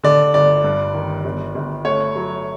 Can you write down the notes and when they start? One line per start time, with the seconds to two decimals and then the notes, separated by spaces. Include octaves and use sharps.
0.04 D3 D5
0.34 G1 D5
0.64 G2
0.94 D#3
1.25 G1
1.55 G1
1.85 A3 C#5
2.16 F#3